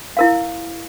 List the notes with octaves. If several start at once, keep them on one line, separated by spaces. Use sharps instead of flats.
E4 A#4 F5